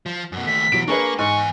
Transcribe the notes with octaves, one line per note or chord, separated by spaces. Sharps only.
F3
F#2 B2
D#2 A3 B6
B2 E3 F#3 D7
A#3 D4 G#4 B4 C#6
E2 G#2 G#5 C#6